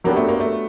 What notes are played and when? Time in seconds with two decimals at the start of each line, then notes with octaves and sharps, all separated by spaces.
0.04 F#3 A#3 B3 D4 G4
0.16 A3
0.29 A#3
0.40 A3